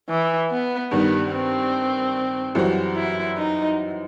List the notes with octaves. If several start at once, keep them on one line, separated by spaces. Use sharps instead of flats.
E3
B3
G2 D#3 G3 B3
C4
F#2 E3 G3 C4 F#4
E4
D#4